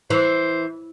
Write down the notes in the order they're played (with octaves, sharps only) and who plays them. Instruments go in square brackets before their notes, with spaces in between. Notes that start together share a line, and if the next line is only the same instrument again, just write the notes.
[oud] E3 [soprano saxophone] C5